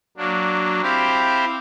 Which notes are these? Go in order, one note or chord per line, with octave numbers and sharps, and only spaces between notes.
F#3 A#3 D4
C4 E4 G4 C5 F5